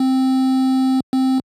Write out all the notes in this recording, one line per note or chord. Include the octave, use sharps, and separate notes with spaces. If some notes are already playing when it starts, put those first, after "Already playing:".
Already playing: C4
C4